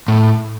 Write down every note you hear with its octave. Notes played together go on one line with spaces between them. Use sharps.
A2